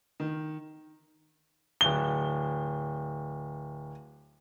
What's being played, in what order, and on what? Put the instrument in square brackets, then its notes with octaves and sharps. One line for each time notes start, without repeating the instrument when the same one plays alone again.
[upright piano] D#3
[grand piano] D1 G7